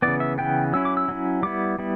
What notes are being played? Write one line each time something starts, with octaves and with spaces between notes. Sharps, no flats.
C#3 E3 B3 D5
E5
C#3 E3 B3 G5
F#3 C#4 E4 E6
D6
E6
F#3 C#4 E4
G3 B3 E4 D6
G3 B3 E4